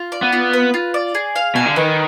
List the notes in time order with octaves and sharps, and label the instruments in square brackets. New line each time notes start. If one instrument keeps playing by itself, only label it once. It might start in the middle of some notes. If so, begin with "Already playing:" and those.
Already playing: [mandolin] F4
D5
[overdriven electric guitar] B3
[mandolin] F4
B4
F4
D5
G#4
F5
[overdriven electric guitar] B2 [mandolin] G#5
[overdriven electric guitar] D3
[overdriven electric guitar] D#3 [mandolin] B4